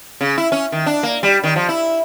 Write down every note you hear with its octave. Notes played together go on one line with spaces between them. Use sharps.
C#3
E4
C#4
D#3
D4
A#3
G3
D#3
F3
E4